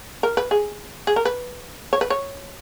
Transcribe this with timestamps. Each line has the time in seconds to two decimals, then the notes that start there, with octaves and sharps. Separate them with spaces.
0.23 A#4
0.37 B4
0.51 G#4
1.07 G#4
1.16 A#4
1.25 B4
1.93 C#5
2.01 B4
2.10 C#5